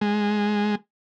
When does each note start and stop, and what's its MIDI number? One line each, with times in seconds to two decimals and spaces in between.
0.01 0.75 56